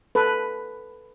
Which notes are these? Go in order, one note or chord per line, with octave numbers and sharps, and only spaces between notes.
A4 B4